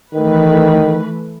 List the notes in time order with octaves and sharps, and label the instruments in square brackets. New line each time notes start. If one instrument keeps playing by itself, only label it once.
[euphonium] D#3 [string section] E3 A3 B4